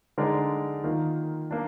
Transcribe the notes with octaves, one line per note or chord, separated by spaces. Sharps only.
D3 G#3 D#4 A#4 D5
D#3 A#3 F4
A#3 D4